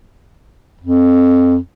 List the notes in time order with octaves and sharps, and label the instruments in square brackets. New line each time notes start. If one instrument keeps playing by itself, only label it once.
[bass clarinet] F2